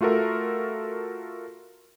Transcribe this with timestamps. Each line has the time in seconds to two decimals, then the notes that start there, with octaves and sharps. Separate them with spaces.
0.01 A3 F4 F#4 A4 A#4 E5